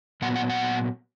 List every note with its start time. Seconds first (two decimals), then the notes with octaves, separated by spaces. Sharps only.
0.22 A#2 F#3 B3 F#5
0.36 F#5
0.49 F#5